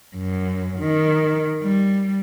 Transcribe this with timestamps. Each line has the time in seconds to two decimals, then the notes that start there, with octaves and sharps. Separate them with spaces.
0.16 F#2
0.80 D#3
1.62 G3